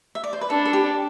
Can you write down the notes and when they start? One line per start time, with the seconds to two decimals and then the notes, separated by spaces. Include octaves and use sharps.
0.15 E5
0.24 D5
0.33 C5
0.41 B4
0.50 D4 A4
0.65 A4
0.73 G4